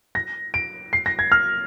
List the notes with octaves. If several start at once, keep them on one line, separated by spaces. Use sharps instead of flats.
A#6
D7
C7
A#6
G#6
F6